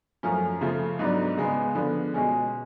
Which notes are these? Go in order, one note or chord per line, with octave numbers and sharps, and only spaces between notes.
F#2 F3 A3 C#4
C#3 F3 A3 F4
G#2 F#3 B3 D4
C#3 G#3 B3
D3 F3 B3
B2 G#3 C#4 G#4